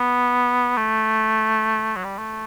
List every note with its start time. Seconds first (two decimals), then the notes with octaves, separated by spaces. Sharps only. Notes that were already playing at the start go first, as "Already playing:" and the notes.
Already playing: B3
0.77 A3
1.96 F#3
2.04 G3
2.18 A3